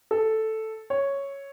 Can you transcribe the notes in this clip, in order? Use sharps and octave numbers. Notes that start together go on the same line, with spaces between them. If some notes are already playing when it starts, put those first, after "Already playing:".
A4
C#5